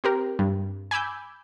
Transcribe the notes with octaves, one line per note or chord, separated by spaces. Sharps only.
C4 G4 A#4
G2
G#5 B5 D6 E6 G6